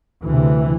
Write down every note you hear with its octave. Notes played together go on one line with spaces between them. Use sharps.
D2 C3 E3